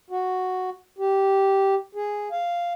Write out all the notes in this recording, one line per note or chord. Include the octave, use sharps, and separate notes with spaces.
F#4
G4
G#4
F5